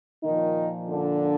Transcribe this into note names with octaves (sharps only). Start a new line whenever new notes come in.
A#2 D#3 F3 D#4
D3 D4